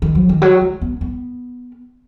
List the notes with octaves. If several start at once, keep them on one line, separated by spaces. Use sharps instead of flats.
D#3
F#3
D#3
F#3
G#3
B3
B3